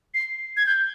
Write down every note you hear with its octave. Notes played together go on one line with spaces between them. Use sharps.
C7
G#6
G6